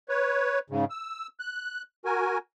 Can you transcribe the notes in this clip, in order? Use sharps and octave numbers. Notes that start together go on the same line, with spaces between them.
B4 C#5
G#2 C#3
E6
F#6
F#4 A#4 G#5